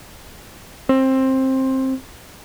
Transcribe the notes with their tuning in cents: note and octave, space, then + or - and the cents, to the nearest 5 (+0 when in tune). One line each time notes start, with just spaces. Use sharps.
C4 +15